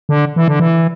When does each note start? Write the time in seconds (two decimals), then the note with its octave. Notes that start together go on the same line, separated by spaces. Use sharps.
0.09 D3
0.36 E3
0.48 D3
0.60 E3